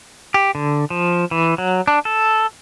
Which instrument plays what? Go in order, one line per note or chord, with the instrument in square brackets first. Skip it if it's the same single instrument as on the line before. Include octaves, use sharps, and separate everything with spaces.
[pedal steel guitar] G4
D3
F3
E3
F#3
D4
A4